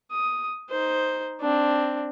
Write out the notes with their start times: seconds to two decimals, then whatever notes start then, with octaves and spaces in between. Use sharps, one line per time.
0.11 D#6
0.69 D#4 C5
1.41 C4 D4